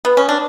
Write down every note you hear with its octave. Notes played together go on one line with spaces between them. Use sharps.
B3
C#4
D4